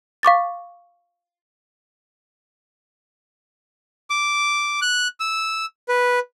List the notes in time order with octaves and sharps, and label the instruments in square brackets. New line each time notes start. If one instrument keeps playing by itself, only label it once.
[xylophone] F5 C#6 D6 A6
[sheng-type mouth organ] D6
F#6
E6
B4